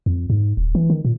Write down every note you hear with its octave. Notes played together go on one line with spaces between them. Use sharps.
F2
G#2
D#1
E3
D#3
A#2